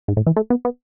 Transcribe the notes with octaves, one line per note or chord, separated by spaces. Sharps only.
G#2
A2
E3
A3
B3
B3